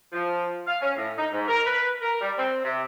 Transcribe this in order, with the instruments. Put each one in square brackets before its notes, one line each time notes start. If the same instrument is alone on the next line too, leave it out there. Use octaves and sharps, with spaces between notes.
[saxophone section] F3
F5
C#4
A2
D#4
G#2
A#4
B4
A#4
G3
C4
C3